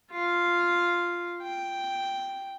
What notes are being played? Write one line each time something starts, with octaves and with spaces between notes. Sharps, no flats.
F4 F5
G5